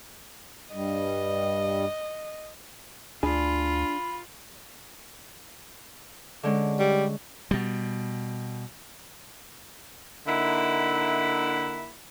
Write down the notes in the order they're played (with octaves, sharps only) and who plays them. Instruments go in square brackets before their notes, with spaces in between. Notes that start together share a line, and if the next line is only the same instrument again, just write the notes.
[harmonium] G2 G3 [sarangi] D#5
[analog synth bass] D2 [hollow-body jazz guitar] D4 G#4 [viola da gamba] F4 [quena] B5
[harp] D3 G#3 C#4
[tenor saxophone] G3
[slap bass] B2 G3
[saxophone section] D3 A#3 D#4 E4 E5 F#5